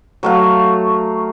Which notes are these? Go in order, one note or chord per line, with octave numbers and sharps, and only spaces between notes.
F#3 A3 F5